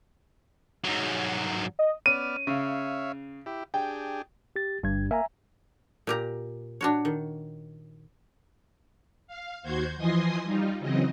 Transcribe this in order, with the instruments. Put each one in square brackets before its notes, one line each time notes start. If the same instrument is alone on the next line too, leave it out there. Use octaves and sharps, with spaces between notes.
[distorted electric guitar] G#2 F#3
[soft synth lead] D#5
[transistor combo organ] B3 D5 F6 [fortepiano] C#4 [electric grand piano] D#7
[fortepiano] C#3 [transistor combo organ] C#5 E5 F5
[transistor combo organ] E4 G4
[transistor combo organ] D4 G4 G#4 [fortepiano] G5
[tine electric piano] G4 A6
[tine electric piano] G1 G#6 [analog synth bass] G2
[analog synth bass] A#3 [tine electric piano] E5 G#5 A#5
[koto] A#2 G4 A#5
D4 F#4 C#5
D#3
[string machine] F5
D#2 F#4 C5 G6 G#6
E3 F3 D#5 G#5 C6 D#6
G3 D#4 F4
C#3 E3 F#3 C4 D#5